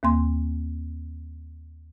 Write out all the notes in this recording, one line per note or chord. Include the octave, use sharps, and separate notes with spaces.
D#2 A#3 C6